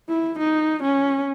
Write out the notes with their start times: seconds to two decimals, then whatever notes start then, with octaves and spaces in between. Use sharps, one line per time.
0.08 E4
0.38 D#4
0.83 C#4